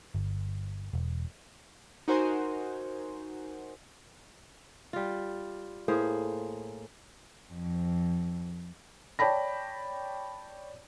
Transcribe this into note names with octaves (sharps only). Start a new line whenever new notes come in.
G1
E1
D#4 F#4 A#4 C5 G#5 C6
G3 F4
A2 A#3 G#4 C5
F2
C#5 D5 G5 A5 B5 A#6